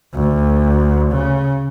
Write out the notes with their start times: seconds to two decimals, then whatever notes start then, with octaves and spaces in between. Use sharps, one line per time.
0.15 D2
1.11 C#3